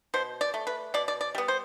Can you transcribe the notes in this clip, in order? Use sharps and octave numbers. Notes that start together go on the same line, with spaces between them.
B2 C5
D5
A3
B4
B2 D5
D5
D5
G3 B3
C5